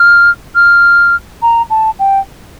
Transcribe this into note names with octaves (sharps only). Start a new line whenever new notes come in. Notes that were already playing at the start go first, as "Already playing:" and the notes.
Already playing: F6
F6
A#5
A5
G5